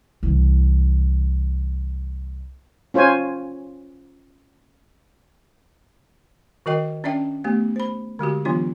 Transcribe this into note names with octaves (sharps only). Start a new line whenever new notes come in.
C2 E3
C#4 F4 C5 C#5 G#5
D#3 F#4 A#4 D#5 G5
C#4 D4 D5 E5 G5
A3 B3 G4
C5 B5
D3 G#3 F#4 G4
E3 F#3 B3 D4 F4